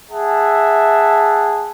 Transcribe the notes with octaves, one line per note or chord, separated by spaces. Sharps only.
G#4 E5 F#5 A5